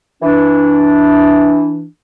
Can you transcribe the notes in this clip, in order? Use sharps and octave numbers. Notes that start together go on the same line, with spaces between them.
E3 D4